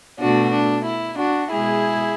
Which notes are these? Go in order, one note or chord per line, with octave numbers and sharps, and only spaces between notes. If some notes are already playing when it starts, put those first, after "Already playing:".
B2 A3 D4 F#4
D4
E4
D4 F#4
B2 G#3 E4 G#4